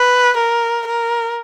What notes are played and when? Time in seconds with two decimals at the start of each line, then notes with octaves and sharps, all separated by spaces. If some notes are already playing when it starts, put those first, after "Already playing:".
Already playing: B4
0.37 A#4
0.87 A#4